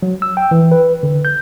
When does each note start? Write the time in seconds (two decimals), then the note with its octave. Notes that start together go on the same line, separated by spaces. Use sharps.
0.02 F#3
0.22 E6
0.37 G5
0.51 E3
0.71 B4
1.03 D3
1.25 G6